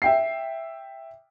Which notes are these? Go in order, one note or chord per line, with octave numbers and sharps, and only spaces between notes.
E5 G5 C7